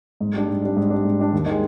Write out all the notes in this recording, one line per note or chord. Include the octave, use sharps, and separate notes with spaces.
G#2
G3 D4
G#2
G3 D4
G#2
G3 D4
G#2
G3 D4
D#2
D#3 G#3